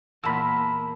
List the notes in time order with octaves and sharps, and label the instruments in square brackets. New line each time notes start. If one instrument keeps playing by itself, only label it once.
[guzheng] E2 A#2 [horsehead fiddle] A#3 [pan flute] A5 [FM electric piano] B5 E6